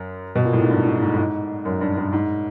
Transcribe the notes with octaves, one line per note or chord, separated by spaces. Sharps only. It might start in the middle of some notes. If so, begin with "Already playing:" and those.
Already playing: F#2
B2
A#2
A2
G#2
G2
G#2
G#2
A2
G#2
F#2
G2
G2
G#2